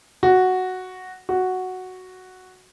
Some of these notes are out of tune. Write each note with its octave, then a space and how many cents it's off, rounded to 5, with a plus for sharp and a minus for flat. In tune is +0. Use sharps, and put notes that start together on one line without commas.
F#4 +0
F#4 +0